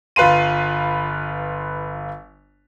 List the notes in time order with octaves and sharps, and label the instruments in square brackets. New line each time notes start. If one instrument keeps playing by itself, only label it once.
[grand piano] G1 F4 B4 F5 C6 D#7